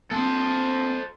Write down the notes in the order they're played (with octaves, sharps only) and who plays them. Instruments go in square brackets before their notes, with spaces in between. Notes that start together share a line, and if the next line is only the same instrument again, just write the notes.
[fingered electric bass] A#3 C4 [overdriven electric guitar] A4 C5